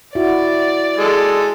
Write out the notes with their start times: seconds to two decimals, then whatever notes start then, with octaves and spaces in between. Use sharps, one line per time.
0.15 E4 F#4 D5
0.98 G#3 A4